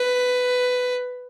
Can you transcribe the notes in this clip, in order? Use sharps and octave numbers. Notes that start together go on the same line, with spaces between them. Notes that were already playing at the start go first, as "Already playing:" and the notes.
Already playing: B4